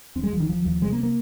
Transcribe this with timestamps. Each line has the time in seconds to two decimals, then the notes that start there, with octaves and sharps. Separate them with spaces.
0.15 D#2 C4
0.23 G#3
0.32 D#2 F3
0.40 D#3
0.49 D#2 F3
0.65 D#2 F3
0.82 C3 G#3
0.92 A#3
1.03 A#3